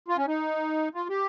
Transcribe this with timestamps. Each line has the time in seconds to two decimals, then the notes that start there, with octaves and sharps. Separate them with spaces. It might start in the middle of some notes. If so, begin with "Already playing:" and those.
0.08 F4
0.17 C#4
0.28 D#4
0.95 F4
1.10 G4